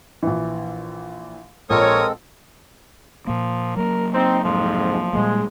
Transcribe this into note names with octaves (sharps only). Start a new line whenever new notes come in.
A#1 E3
A#1 G#3 C4 A4 A#4 C#5 D#6
A#2 F3 A#3
F#3 A#3 A#4
C4 D#4
C2 F2 G#2 F3
A#2 G3 G#3 A#3